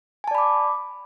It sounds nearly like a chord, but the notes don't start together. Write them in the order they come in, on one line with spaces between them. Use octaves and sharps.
G#5 A5 D5 B5 D6